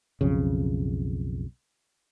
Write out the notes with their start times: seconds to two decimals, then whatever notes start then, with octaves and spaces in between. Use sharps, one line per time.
0.21 B1 F2 C#3